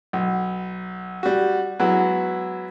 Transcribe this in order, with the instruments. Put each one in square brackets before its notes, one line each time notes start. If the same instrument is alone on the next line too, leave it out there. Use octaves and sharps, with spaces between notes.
[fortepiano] B1
G3 F#4
F#3 G#3 B3 E4 F#4